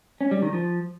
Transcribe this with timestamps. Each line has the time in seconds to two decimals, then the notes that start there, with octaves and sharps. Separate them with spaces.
0.21 C#4
0.31 G3
0.42 D#3
0.53 F3